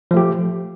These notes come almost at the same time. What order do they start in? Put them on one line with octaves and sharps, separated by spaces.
F3 A3 G4